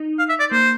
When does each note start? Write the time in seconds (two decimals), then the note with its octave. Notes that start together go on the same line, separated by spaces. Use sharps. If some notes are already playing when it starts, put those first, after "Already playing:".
Already playing: D#4
0.19 F5
0.29 E5
0.40 D5
0.51 A#3 C5